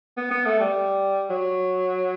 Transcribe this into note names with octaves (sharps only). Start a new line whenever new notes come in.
B3
B3
A3
G3
F#3